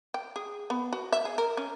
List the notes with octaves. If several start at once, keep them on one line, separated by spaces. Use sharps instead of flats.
G5
G#4
B3
F#4
E5
G#4
A#4
C#4